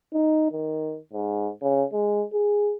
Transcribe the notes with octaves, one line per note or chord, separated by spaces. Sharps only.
D#4
D#3
G#2
C#3
G#3
G#4